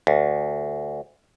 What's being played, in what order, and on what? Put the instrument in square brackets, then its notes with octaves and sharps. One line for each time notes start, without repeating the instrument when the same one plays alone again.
[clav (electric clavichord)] D2